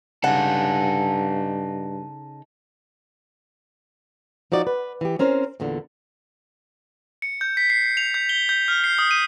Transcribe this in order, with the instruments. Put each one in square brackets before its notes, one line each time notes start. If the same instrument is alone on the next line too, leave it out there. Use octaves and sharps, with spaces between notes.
[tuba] G2 [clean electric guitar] C#3 [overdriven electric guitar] D#4 A4 [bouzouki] F#5
[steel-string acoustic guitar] F3 D#4 F#4 D5
B4
E3 G4
C4 C#4 A#4 C5
E2 A#2 D3
[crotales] C#7
G6
B6
C7
F7
G6
G7
G6
F6
C7
D#6
D#7